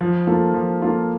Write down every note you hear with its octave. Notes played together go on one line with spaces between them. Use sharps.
F3
A#3 F4 A4
F3
A#3 F4 A4